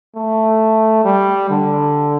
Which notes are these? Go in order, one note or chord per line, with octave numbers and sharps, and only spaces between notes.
A3
G3
D3